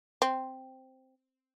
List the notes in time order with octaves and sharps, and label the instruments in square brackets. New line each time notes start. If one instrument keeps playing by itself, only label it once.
[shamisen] C4